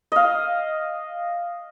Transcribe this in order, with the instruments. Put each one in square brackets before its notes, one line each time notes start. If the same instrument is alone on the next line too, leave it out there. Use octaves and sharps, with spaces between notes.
[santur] D#5 F5